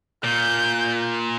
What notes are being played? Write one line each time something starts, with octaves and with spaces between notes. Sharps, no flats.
A#2 G6